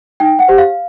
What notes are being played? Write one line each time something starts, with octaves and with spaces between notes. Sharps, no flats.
D#4 G5
F#5
G4 C5
F5